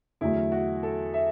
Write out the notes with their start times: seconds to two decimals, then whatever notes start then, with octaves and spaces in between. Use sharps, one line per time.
0.21 E2 D3 F#3 A3 E4
0.52 F#4
0.83 A4
1.14 E5